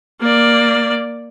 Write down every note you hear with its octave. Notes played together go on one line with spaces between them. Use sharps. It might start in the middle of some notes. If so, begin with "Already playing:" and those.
A#3 D5